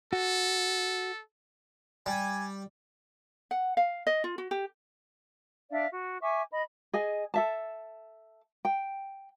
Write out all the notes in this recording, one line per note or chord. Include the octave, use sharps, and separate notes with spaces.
F#4 A4
G3 G#5
F#5
F5
D#5
F4
F#4
G4
D4 D5 E5 F5
F#4
E5 G#5 C#6 D6
D#5 B5
G#4 D#5 G#5
A4 E5 A5
G5